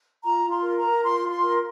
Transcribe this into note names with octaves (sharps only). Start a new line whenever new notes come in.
F4 A#5
F4
C6
A#4
A#5
A#4
F4 C6
F4
C6
A#4